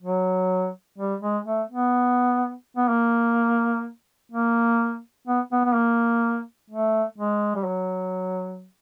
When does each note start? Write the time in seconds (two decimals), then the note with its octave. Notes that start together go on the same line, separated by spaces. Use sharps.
0.02 F#3
0.98 G3
1.21 G#3
1.45 A3
1.69 B3
2.77 B3
2.89 A#3
4.32 A#3
5.27 B3
5.52 B3
5.64 B3
5.75 A#3
6.70 A3
7.18 G#3
7.55 G3
7.66 F#3